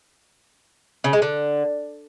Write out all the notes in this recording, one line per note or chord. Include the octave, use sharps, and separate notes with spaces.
C#3
G#3
D3